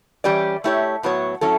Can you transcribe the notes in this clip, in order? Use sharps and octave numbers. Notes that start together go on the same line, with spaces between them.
E3 G3 C#4 G4 D5
A3 E4 G4 C#5
A2 F#3 B3 F#4 C#5
F#3 C#4 E4 A4